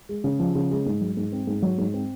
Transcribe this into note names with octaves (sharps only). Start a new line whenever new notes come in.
G#3
C#3
F3
C#3
G#3
G#2
F#3
G#2
C4
G#2
F#3
G#2
C4